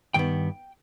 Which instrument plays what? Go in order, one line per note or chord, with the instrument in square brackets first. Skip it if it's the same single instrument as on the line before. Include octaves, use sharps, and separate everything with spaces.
[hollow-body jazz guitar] G2 D#3 B3 G5